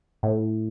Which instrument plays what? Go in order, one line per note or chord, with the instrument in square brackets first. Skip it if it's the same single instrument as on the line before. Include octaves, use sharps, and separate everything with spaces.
[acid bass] A2